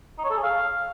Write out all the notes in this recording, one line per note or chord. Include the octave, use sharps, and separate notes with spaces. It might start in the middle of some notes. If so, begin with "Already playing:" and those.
D#4
C#5
A4
G#4
F5